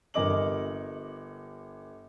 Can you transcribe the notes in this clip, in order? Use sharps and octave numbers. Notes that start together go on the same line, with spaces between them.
G1 A#4 D#5 D6 F#7